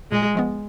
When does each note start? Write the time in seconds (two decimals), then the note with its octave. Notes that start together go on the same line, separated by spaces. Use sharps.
0.11 A#2 G#3
0.35 F3 G#3 B3